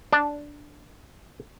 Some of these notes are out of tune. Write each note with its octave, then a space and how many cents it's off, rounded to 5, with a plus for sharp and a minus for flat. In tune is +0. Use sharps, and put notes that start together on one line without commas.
D4 +0